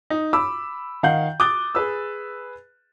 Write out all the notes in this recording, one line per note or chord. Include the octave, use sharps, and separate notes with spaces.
D#4
B5 D6 E6
D#3 F5 F#5 G6 F#7
D6 D#6 F#6 A6 G7
G#4 B4 E6